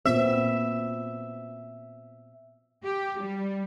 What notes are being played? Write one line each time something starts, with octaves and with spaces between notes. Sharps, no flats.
A#2 B3 C4 E5
G4
G3